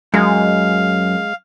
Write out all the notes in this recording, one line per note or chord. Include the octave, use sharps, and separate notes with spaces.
F#2 G#3 F5